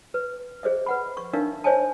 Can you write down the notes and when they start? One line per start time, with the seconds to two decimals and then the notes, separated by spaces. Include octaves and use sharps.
0.14 B4
0.63 G#4 C5 D#5 E5
0.86 B4 F#5 B5
1.17 C#6
1.33 D4 D#4 A#4 E5 F5
1.64 C5 C#5 D#5 G#5 A5